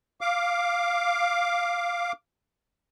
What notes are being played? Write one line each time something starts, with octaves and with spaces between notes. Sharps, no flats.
F5 D6